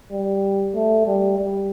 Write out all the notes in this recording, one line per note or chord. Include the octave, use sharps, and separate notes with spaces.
G3
A3
G3
G3